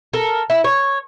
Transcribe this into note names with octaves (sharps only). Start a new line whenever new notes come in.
A4 A#4
E4
C#5